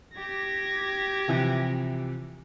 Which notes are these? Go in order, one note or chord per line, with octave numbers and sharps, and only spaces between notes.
G4 G#6 A#6
C3 E3 F3